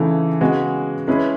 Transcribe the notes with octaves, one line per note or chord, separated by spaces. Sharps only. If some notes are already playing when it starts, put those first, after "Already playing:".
Already playing: C#3 E3 A3 D#4
C#3 G#3 B3 F#4
G#3 C#4 E4 G#4 B4